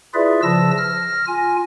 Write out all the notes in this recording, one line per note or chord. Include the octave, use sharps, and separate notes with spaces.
E4 F4 G#4 B4 D5 E5
C#3 F3 A5 E6 A#6
F6 A#6
F4 G#5